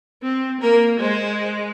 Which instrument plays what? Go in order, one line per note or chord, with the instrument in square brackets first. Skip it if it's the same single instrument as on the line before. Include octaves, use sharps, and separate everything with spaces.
[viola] C4
[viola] A#3 [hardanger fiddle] A#4
[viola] G#3 [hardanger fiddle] C5